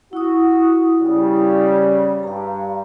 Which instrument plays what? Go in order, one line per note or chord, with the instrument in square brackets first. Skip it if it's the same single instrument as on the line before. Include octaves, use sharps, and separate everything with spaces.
[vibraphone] E4 D#6 [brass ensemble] F#4
[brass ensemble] C#3 G3
[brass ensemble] G2 [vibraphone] F5 A#5